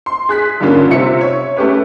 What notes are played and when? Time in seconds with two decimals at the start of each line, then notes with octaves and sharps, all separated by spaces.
0.06 C6
0.29 G#4 F#6 B6
0.60 G2 D3 G3 A#3 C#4 F4
0.90 C3 C4 F4 E5 C#7
1.21 C#5
1.56 A3 C#4 G4 B4 C#5